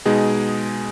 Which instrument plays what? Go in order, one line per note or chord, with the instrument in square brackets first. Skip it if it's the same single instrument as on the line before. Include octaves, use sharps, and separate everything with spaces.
[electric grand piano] B2 G#3 D#4 G#4